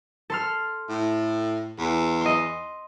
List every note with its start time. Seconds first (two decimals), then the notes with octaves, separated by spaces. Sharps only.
0.30 A4 C6 F6
0.89 A2
1.79 E2
2.21 D#5 C6